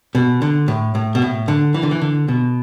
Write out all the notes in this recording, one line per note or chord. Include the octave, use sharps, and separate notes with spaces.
B2
D3
A2
A2
B2
A2
D3
E3
D3
E3
D3
B2